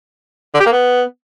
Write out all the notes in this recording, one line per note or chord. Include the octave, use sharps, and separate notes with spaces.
D3
G4
A#3
B3